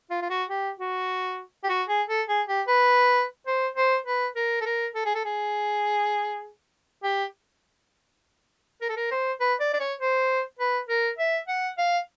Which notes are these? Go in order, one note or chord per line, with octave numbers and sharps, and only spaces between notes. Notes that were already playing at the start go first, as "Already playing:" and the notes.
F4
F4
F#4
G4
F#4
G4
F#4
G#4
A4
G#4
G4
B4
C5
C5
B4
A#4
A4
A#4
A4
G#4
A4
G#4
G4
A#4
A4
A#4
C5
B4
D5
D5
C#5
C5
B4
A#4
E5
F#5
F5